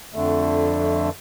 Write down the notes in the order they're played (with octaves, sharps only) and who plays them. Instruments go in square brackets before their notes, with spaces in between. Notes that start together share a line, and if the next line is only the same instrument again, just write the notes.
[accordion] F2 D3 A3